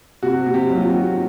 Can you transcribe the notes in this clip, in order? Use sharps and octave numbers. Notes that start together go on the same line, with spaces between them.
C3 F#4
C3
G4
F#3
F4
F#4
D#3